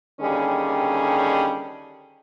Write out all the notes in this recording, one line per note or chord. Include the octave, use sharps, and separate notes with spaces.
D#2 D3 D#3 G3 C#4 G#4